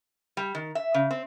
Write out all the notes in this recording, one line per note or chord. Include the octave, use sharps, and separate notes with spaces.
G3
D#3
E5
C#3
C4